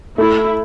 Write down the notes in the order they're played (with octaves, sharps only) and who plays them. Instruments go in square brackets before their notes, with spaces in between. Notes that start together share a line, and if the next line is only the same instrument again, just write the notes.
[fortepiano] A3 [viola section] E4